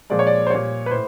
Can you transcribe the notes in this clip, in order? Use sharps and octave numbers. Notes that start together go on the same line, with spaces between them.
A#2 F3 G#3 D5
C#5
D5
C5
A#2 G3 C#5
B4
A2 C5